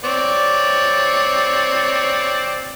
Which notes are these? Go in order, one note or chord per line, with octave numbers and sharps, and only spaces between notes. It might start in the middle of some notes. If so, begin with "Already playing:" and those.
C4 C#5 D5